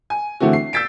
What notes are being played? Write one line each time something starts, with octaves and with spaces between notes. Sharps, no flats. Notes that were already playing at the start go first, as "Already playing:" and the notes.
G#5
D3 E3 A3 C4 F#4
C7
E6 G6 A6 B6 D7